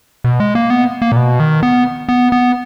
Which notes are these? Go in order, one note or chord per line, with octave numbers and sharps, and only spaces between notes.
B2
G#3
A#3
B3
A#3
A#2
B2
D#3
B3
B3
B3